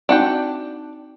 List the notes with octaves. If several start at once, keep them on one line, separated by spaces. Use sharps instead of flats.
C4 D4 D#4 F#4 F#5 G5